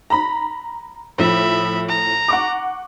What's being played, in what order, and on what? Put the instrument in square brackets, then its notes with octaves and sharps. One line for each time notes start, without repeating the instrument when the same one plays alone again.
[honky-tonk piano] A#5 B5
[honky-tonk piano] A2 F3 [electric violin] E5 B5
[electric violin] A#5
[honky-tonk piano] F#5 C#6 D6